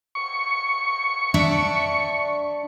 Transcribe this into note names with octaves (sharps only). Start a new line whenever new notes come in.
C#6
D4 E5